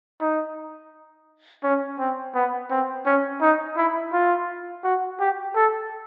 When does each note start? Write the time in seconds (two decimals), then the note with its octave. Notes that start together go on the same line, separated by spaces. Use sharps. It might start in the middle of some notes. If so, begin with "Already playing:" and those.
0.21 D#4
1.63 C#4
1.99 C4
2.35 B3
2.70 C4
3.06 C#4
3.42 D#4
3.77 E4
4.13 F4
4.84 F#4
5.19 G4
5.56 A4